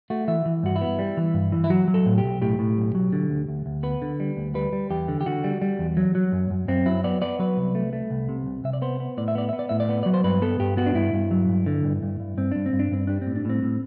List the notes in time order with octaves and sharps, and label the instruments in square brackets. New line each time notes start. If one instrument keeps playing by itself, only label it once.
[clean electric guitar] A3 F#4
E3 E5
E3
G2 F#4
E4
B3
G3
E3
G2
E3
E4
F#3 F#4
F#3
A4
A2
G4
B1
A2 G4
A2
B1
F#3
D3
D2
D2
D2
B3 B4
D3
G3
D2
G3 B4
G3
E2 G4
D3
G4
D3 F#4
G3
G3
E2
F#3
F#3
F#2
F#2
F#2 C4
F#3 E4
B3 D5
B3 D5
F#3 B4
C2
A3
A3
C2
C3
C2
C3 E5
D5
B3 C5
B3
A2 D5
E5
B3 D5
B3 E5
D5
A2 E5
D5
B3
F#3 D5
C5
G2 B4
B3 A4
G2 G4
B3 F#4
D4
G2 E4
G2
F#3
G2
D3
G2
G2
G2
G2 C4
G2 D4
C4
G2
D4
G2 C4
G3 D4
C4
A2
D4
A2 C4
A2